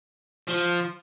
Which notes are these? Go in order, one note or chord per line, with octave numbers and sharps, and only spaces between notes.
F3